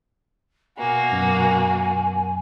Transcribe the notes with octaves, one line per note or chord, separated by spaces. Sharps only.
B2 A#3 F#4 G#5
F#2